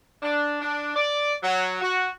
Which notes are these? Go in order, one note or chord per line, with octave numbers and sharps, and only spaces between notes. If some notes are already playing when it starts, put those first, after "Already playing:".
D4
D4
D5
F#3
F#4